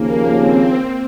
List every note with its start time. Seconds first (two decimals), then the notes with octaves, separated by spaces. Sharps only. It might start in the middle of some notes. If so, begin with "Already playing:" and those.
Already playing: D#2 C#3 F3 A#3
0.37 C4